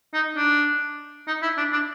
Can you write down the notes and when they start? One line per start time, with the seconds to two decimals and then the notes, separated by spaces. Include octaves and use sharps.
0.14 D#4
0.37 D4
1.28 D#4
1.43 E4
1.58 D4
1.73 D4